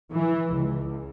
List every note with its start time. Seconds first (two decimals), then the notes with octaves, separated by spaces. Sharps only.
0.13 E3
0.54 C#2